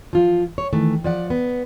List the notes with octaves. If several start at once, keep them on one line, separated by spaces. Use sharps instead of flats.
F3 F4
C#5
D#3 E3 A3
F3 D5 F#5
B3